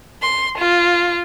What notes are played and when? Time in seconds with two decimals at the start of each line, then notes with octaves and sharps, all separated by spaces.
0.23 C6
0.59 F4